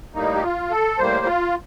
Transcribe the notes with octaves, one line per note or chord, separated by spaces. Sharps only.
A2 G3 A#3 D#4
G4
F4
A4
A2 G3 A#3 C5
F4